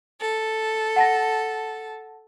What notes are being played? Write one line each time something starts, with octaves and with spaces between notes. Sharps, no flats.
A4
F#5 A5 A#6